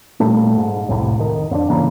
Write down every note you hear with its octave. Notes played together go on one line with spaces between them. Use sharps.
A#2 G3 A3
G#2
C2 F2 A2 C3
D#3
F2 D4
G#2 C#3 E3 A#3